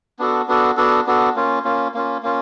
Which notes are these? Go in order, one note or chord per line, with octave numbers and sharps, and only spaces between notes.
B3 D4 F#4 A4
B3 D4 F#4 A4
B3 D4 F#4 A4
B3 D4 F#4 A4
A#3 C#4 F4
A#3 C#4 F4
A#3 C#4 F4
A#3 C#4 F4